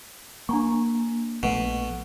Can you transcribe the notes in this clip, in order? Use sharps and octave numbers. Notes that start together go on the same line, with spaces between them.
A#3 D4 A#5 C#6
A#1 B2 A3